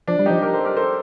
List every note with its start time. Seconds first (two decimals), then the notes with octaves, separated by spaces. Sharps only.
0.07 F3 D4
0.19 G3
0.26 F3 D#4 G4
0.42 G4 A#4
0.54 A4 C5
0.65 G4 A#4
0.77 A4 C5